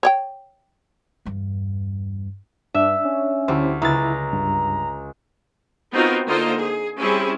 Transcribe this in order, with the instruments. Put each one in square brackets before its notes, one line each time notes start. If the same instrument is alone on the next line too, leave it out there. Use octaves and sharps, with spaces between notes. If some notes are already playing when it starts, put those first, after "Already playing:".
[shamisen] C#5 D5 G5
[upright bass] E2 G2
[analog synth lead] G2 [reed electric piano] D4 [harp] E5
[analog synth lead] C#4
[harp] D2 [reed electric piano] E4 G4 C5
[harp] C#2 A6 [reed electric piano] E4 [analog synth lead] A#5
[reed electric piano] G2
[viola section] B3 C4 D#4 F4 F#4 A#4
D3 A#3 D#4 F4 C5 D#5
G#4
G3 C4 C#4 E4 G#4